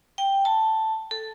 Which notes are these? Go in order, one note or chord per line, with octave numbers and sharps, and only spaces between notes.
G5
A5
A4